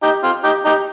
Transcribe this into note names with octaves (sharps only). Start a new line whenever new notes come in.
D#4 G4
C4 F4
D#4 G4
D#4 G4